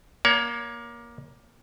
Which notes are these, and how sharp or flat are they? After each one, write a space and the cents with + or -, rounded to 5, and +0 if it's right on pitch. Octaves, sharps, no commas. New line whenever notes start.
A#3 +20 C#5 +35